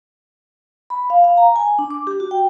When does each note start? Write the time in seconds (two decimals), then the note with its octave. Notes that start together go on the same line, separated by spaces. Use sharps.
0.90 B5
1.10 F5
1.24 F5
1.37 A#5
1.56 G#5
1.79 D4
1.90 D6
2.07 G4
2.20 F#4
2.31 G5